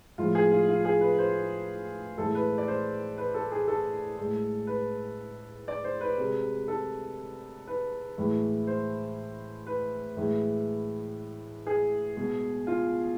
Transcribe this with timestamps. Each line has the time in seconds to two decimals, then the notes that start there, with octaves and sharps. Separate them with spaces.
0.18 A2 F3 G#3 F4
0.35 G#4
0.51 F4
0.68 F4
0.85 G#4
1.01 B4
1.18 C5
2.18 A2 E3 G#3 A4
2.35 B4
2.58 D5
2.68 C5
3.18 B4
3.34 A4
3.51 G#4
3.68 A4
4.18 A2 G#3
4.67 B4
5.68 D5
5.84 C5
6.01 B4
6.18 C3 G#3
6.68 A4
7.67 B4
8.17 A2 E3 G#3
8.67 C5
9.67 B4
10.17 A2 E3 G#3
11.67 G#4
12.16 B2 G#3
12.67 F4